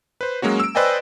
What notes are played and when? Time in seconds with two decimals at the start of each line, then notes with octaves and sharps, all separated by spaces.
0.21 B4 C5
0.42 F#3 G#3 A#3 C#4 F#4
0.60 E6 D7
0.75 B4 C5 D5 D#5 G5 G#5